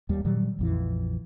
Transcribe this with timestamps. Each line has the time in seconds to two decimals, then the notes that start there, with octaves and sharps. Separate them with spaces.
0.09 D#2 G3
0.25 A#2 D#3 F#3 G3
0.59 A#1 F2 E3